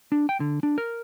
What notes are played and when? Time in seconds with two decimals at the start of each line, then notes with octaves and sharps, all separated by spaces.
0.12 D4
0.29 G5
0.40 D3
0.63 D4
0.78 A#4